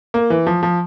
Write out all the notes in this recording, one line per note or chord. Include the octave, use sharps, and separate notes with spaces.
A#3
E3
F3
F3